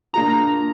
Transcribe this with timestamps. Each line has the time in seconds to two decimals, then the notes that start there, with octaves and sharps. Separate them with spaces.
0.13 A#3 D4 F4 G#4 A#5